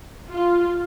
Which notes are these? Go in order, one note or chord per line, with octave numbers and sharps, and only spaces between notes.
F4